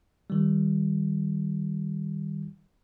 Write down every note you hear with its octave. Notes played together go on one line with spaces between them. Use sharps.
D#3 G3